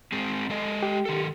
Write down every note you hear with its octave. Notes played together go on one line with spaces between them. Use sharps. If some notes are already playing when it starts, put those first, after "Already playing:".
G#3 C4 G#4
G#3 A4 D#5
G4
D#3 A4